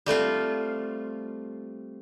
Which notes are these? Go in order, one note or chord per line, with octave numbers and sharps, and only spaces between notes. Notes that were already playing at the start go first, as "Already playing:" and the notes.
G3 A3 C4 F4